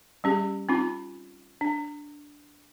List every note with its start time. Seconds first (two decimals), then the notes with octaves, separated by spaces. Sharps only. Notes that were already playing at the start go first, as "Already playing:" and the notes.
0.24 G3 C#4 G4 G#4
0.69 C4 C#4 D#4 F4
1.61 D4